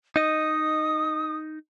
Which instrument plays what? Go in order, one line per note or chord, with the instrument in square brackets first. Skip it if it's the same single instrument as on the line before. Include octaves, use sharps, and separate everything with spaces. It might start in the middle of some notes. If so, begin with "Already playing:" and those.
[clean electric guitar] D#4 D#5 [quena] D#6